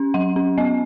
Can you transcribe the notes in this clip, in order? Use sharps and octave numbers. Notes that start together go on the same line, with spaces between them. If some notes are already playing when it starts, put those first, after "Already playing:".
Already playing: C#4
F#3 F#5
C#4
B3 D#5